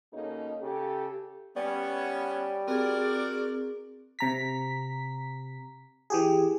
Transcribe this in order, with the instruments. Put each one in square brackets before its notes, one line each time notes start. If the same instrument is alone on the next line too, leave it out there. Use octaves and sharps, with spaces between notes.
[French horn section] B2 A#3 C#4 D#4 G#4 A4
C#3 G4 A4
[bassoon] G3 [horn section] B3 C#4
[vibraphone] C4 G#4 [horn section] F#4 A#4 D5
[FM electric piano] C3 A#5 B6
E3 G4 G#4